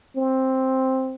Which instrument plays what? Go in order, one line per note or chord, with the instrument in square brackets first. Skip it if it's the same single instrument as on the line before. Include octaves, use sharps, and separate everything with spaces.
[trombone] C4